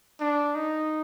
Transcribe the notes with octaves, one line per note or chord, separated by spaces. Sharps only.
D4
D#4